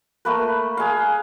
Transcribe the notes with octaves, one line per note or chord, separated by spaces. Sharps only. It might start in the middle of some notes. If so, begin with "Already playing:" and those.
A3 A#3 B4
G#4 F5